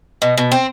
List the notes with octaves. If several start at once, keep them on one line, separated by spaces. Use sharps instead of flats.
B2
B2
C4